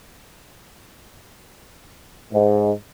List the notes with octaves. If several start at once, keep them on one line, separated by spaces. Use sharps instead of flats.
G#2